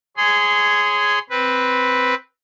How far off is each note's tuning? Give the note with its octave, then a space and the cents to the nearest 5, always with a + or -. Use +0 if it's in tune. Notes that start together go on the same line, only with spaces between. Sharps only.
G#4 +0 C#5 +0 C6 -25
C4 +0 B4 +0